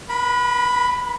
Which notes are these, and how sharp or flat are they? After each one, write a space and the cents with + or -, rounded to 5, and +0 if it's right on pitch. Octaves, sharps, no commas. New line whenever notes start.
B4 -40 B5 +10